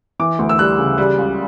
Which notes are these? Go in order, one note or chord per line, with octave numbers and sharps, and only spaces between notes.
E3 D6
D2
E6
G3 F#6
C#3
G3
C#2